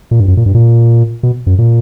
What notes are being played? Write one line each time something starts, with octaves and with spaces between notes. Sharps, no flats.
A#2
G2
F#2
A#2
G2
A#2
B2
F#2
A#2